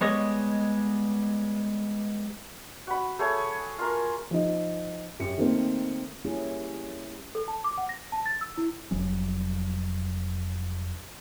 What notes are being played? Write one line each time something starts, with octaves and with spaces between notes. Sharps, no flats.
G3 G#3 B3 C#5 D#5
F#4 B5
A3 G#4 C#5
F4 A#4
F3 D#4
F#2 C#4 G4 C#7
D#3 A3 A#3 C4
G3 A#3 C#4 E4 G4 G#4
A4
A5
D6
F#5
A#6
A5
A6
E6
E4
F1 F#3 G3 C#4